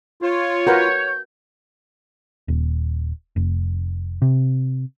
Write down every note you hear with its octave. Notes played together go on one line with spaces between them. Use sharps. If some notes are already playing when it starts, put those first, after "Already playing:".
F4 C#5
F#4 A#4 B4 G6
D#1
F1
C3